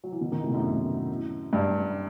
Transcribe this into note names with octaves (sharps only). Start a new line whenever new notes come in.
F#3
E3
B2 D#3
B2 D#3
A2 C3
B2
F#2 A2
G2